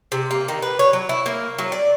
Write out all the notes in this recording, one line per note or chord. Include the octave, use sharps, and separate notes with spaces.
C3
A#3
D#3
B4
C#5
F#3
E4
A#3
F#3
D5